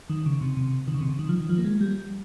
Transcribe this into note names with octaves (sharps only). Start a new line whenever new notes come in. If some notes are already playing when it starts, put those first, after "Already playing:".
D#3
C#3
C3
C3
D#3
C#3
C3
C#3
D#3
F3
D#3
F3
A#3
G#3
G3